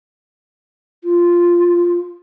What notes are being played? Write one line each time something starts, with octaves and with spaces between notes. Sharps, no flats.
F4